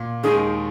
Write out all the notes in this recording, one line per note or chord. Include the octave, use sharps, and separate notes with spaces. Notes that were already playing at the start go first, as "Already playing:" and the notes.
Already playing: A#2
D#2 D#3 G#3 D#4 G#4